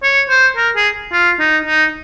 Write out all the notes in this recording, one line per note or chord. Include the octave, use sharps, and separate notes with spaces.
C#5
C5
A#4
G#4
F4
D#4
D#4